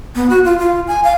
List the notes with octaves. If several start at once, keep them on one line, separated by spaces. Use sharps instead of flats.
B3
F#4
F4
F4
G#5
F5